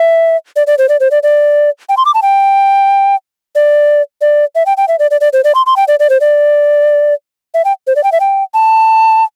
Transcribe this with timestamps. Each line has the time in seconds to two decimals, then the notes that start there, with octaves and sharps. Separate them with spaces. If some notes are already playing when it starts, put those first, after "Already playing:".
Already playing: E5
0.56 D5
0.67 D5
0.78 C5
0.89 D5
1.00 C5
1.11 D5
1.23 D5
1.89 G5
1.97 C6
2.05 D6
2.14 A5
2.22 G5
3.55 D5
4.21 D5
4.55 E5
4.66 G5
4.77 G5
4.88 E5
4.99 D5
5.11 D5
5.21 D5
5.33 C5
5.44 D5
5.55 C6
5.66 C6
5.76 G5
5.88 D5
6.00 D5
6.10 C5
6.21 D5
7.54 E5
7.65 G5
7.87 C5
7.96 D5
8.04 G5
8.12 E5
8.20 G5
8.54 A5